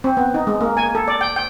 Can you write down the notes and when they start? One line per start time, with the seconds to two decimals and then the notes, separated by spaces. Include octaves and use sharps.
0.04 C4
0.17 B3
0.34 D#4
0.47 G#3
0.61 A#3
0.77 G#5
0.95 A4
1.08 D5
1.21 G5
1.36 G5